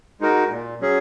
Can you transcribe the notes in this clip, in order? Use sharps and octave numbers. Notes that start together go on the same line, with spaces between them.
G#3 D#4 F#4 A#4
A#2
F#3 C#4 G#4